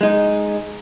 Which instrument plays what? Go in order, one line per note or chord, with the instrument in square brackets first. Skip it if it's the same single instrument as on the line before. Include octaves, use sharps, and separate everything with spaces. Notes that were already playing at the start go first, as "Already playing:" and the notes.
[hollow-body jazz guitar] G#3 D#4